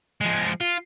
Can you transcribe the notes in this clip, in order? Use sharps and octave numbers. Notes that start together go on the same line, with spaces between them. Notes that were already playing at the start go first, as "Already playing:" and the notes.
F3 G#3
F4